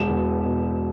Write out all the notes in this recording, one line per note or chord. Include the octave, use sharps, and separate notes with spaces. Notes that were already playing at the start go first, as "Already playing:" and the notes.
Already playing: E1 B2 E7
E2
B2